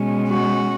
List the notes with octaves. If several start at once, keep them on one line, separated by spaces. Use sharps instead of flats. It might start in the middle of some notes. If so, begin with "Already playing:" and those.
Already playing: B2 G#3 C#4
F#4